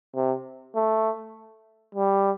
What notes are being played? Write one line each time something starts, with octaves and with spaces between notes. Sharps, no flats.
C3
A3
G3